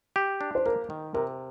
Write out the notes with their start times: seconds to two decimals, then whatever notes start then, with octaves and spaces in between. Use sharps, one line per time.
0.16 G4
0.41 D4
0.55 C5
0.66 A#3 A#4
0.90 D#3
1.14 C3 A#4